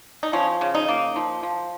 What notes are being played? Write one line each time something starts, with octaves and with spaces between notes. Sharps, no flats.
D#4
F3 C#4
C#3
D#4
A#3
F3
F3